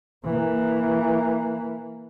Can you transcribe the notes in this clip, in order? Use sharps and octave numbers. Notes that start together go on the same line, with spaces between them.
E3 A#3